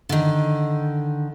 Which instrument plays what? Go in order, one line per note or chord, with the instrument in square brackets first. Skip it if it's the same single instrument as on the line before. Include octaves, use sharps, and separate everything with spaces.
[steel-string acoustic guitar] D3 D#3